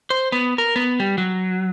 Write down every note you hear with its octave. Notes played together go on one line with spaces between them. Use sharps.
C5
B3
A#4
B3
G3
F#3